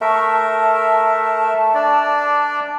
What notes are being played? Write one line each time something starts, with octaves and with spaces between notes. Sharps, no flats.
A3 A#4 E5 A5 C#6
A5
D4 D5